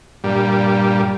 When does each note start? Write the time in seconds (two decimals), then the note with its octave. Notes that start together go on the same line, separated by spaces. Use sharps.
0.24 G2 A#2 G3